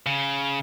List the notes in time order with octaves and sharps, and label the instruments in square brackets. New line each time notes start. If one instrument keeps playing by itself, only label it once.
[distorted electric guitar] C#3